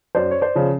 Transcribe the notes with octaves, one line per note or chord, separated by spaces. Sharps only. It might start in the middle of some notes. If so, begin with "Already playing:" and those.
F#2 C5 D5
C#5
C5 D5
C#3 F3